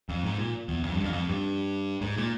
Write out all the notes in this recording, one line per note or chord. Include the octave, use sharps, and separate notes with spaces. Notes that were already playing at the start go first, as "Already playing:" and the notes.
F2
G#2
A#2
E2
F2
G2
F2
F2
G2
G#2
A#2